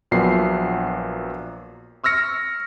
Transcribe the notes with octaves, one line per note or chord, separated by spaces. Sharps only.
A#1 A#2 F#3 B3 C7
C#6 E6 F6 A#6 C#7